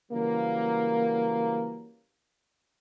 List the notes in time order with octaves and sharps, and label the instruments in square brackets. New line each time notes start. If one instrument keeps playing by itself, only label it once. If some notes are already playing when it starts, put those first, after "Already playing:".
[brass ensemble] C#3 E3 F#3 G3 A#3